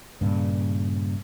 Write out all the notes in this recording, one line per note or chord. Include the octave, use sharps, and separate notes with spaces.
G2 A#2 C#3